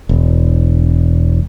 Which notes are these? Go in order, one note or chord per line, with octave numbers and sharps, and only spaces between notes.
E1